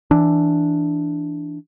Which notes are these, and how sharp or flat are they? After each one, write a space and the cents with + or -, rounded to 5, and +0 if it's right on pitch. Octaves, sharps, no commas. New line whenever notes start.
E3 +0 D4 +0